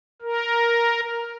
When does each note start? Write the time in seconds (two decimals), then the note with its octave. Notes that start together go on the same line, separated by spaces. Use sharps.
0.22 A#4